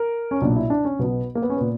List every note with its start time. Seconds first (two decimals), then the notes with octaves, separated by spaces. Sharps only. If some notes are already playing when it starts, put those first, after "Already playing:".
Already playing: A#4
0.31 C#4
0.41 B1 A#2 D4
0.56 E4
0.70 D4
0.85 C#4
0.99 B1 B2 B3
1.35 A#3
1.42 B3
1.50 C#4
1.57 A#2 B3